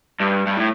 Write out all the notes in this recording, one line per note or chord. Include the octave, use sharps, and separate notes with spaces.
G2
G2
A2